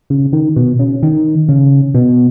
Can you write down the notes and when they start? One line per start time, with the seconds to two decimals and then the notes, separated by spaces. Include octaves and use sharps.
0.10 C#3
0.33 D#3
0.56 B2
0.79 C#3
1.03 D#3
1.49 C#3
1.94 B2